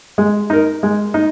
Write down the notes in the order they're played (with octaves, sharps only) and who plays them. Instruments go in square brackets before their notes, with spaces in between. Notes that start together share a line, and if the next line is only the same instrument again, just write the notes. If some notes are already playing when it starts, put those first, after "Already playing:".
[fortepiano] G#3
D#4 A#4
G#3
D#4